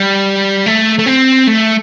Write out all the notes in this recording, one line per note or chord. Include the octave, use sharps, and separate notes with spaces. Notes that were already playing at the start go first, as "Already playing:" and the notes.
Already playing: G3
A3
A3
C4
A3